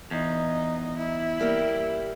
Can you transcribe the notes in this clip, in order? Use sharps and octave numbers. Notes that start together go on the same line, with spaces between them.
E2 D#4
E4
G3 A#3 G4